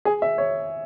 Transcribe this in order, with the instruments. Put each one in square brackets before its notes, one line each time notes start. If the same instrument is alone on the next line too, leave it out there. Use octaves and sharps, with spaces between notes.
[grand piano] G#4
E5
C#5